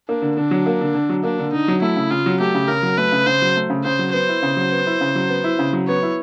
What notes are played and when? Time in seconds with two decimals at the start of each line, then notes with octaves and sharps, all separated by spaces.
0.09 A#3 D4
0.22 D3
0.37 D3 D4
0.51 F#3
0.66 A#3
0.81 D3
0.94 D3
1.09 F#3
1.23 A#3 D4
1.39 D3
1.52 D3 D#4
1.68 F#3
1.82 A3 E4
1.96 C#3
2.11 C#3 F4
2.26 F#3
2.40 A3 G4
2.55 C#3
2.68 C#3 A#4
2.83 F#3
2.98 A3 B4
3.12 C#3
3.27 C#3 C5
3.42 F#3
3.56 A3
3.70 C#3
3.85 C#3 C5
3.99 F#3
4.13 B3 C5
4.29 E4
4.43 C#3
4.57 F#3
4.72 B3
4.87 E4
5.01 C#3
5.15 F#3
5.29 B3
5.44 E4
5.59 C#3
5.73 F#3
5.88 B3 C#5
6.03 E4